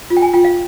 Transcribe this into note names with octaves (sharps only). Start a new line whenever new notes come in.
F4
G5
G#5
F4 G5
F5